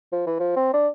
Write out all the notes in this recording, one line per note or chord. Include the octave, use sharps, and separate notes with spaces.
F3
E3
F3
C4
D4